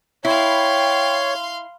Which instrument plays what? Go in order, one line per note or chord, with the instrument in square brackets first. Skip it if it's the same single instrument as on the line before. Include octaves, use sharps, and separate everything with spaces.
[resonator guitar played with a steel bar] E4 [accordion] C#5 [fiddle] F5 C6 [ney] G5